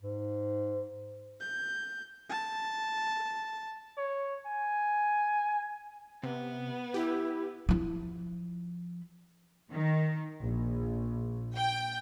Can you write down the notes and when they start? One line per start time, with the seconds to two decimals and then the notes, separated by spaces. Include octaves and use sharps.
0.02 G#2
1.40 G6
2.29 A5
3.97 C#5
4.46 G#5
6.23 C3 B3
6.94 E4 G4
7.69 F3 E4
9.70 D#3
10.42 A#1
11.56 G5